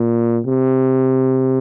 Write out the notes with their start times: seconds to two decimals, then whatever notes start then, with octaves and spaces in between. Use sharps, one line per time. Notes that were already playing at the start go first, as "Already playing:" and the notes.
Already playing: A#2
0.46 C3